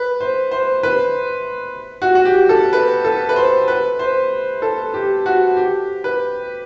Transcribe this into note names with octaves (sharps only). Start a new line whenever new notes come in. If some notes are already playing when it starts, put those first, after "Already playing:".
Already playing: B4
C5
C5
B4
F#4
F#4
G4
A4
B4
A4
B4
C5
B4
C5
A4
G4
F#4
G4
B4